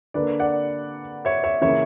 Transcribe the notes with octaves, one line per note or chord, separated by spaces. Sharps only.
D3 A#3 B4 D5
D5 F#5
C#5 E5
C#5 E5
C#3 E3 A#3 C#5 E5